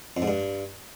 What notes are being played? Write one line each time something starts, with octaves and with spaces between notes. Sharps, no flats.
F2
G#2
G2